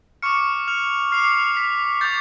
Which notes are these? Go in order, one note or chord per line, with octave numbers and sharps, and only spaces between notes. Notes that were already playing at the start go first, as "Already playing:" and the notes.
C#6 D6 F6 C#7
F6 F7
D6 F6 C7
B6
D6 G6 A6